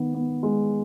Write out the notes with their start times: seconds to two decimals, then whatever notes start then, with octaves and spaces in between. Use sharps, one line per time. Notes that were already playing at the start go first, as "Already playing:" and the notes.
Already playing: D#3 B3
0.14 B3
0.43 G#3